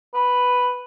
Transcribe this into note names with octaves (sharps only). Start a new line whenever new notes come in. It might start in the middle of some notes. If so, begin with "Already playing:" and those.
B4